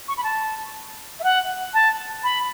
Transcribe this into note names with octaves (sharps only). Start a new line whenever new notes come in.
C#6
B5
A5
E5
F#5
A5
B5